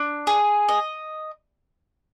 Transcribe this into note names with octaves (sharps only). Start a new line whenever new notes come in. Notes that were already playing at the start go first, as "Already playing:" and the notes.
Already playing: D4
G#4
D#5